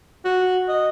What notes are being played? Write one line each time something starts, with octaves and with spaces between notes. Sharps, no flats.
F#4
D#5